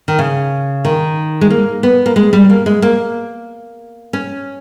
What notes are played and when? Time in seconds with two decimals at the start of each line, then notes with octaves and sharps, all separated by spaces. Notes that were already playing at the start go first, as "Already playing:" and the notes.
0.08 D#3
0.19 C#3
0.85 D#3
1.41 G#3
1.50 A#3
1.83 B3
2.06 A#3
2.16 G#3
2.33 G3
2.50 A#3
2.66 G#3
2.82 A#3
4.13 C#4